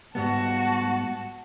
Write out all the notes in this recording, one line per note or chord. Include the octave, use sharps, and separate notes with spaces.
G#2 G3 B3 F#4 A5